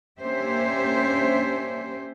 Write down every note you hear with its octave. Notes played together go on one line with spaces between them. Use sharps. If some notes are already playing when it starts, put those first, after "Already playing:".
A#3 C#4 D4 G4 C5 E5